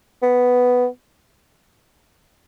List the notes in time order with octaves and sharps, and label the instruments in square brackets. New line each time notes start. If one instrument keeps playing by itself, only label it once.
[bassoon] B3